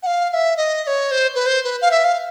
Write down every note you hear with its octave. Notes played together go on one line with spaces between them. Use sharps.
F#5
F5
F5
E5
D#5
D#5
C#5
C5
B4
C5
B4
F5
E5
F5